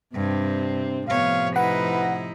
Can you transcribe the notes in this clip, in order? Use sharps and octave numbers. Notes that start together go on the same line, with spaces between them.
G2 C3 C4 D4
A2 C3 F3 B3 C#5 F5
D#4 E4 B4 F#5